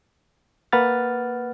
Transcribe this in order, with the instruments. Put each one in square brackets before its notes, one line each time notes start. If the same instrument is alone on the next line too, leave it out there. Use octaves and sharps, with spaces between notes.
[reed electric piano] A#3 B4 F#5 F6 A6